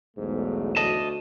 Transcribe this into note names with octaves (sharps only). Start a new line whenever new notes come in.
B1 E2 G#2 A3
D2 D#5 A5